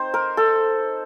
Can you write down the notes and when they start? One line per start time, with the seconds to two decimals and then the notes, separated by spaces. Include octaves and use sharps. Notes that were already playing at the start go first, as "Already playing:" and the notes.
Already playing: C4 D#4 C5
0.14 A#4
0.37 A4